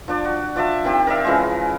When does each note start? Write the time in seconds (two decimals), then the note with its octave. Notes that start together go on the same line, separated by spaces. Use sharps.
0.08 F3 D4 D5
0.25 F#4
0.56 F3 D5 E5 A5
0.84 D#3 C4 G4
1.07 A#4 D5 E5 F5
1.25 C#3 E3 F3 G#3